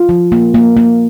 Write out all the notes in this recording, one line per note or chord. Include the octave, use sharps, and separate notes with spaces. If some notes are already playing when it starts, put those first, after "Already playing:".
Already playing: F4
F3
A#3
A#3
A#3